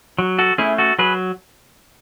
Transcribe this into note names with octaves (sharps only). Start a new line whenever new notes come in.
F#3
F#4 A4
A3 C#4 E4 G#4
F#4 A4
F#3 G#4 B4